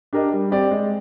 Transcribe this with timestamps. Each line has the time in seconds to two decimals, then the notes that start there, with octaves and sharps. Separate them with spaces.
0.13 D4 G4 A#4 D#5
0.32 G3
0.51 C4 G4 D5
0.71 G#3